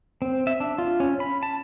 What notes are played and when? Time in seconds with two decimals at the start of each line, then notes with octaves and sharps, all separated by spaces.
0.22 C4
0.47 E5
0.60 D4
0.78 F4
1.00 C#4
1.20 B5
1.43 A5